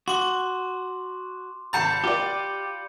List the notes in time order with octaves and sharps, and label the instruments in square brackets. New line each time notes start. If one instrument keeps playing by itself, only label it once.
[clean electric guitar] F#4 [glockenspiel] C6 D6
[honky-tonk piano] G#1 A5 A6 [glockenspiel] B5 G6 C#7
[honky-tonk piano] F4 D5 [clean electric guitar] G4